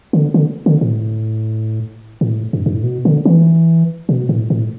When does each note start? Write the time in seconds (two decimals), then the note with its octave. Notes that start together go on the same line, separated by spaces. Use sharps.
0.13 D3
0.34 D3
0.66 D3
0.81 A2
2.21 A2
2.53 G2
2.66 G2
2.75 A2
2.84 B2
3.05 D3
3.25 E3
4.09 B2
4.29 A2
4.50 A2